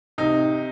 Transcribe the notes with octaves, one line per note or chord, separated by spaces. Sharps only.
C3 D#4